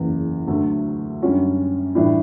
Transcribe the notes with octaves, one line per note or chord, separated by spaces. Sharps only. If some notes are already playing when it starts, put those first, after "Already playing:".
Already playing: F#1 E2 C#3
D2 D3 F#3 A3
F#2 D3 G3 C#4 F#4
A2 E3 G3 D4